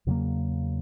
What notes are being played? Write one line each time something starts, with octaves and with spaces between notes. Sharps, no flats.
E2 C#3 F#3 A#3